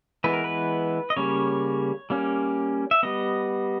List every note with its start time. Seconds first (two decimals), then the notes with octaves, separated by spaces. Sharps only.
0.24 E3 G#3 B3 B4
0.33 A#4
0.44 B4
1.10 D#5
1.16 C#3 G3 A#3 C#4 C#5
2.10 G3 A#3 C#4
2.91 E5
3.03 G3 B3 D#5